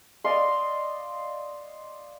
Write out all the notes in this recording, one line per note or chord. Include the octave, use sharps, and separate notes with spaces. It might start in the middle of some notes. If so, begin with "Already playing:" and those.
D5 D#5 F5 C6